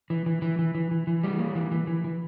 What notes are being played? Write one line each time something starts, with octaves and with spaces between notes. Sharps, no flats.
E3
E3
E3
E3
E3
E3
E3
G3
A#3
E3
E3
E3
E3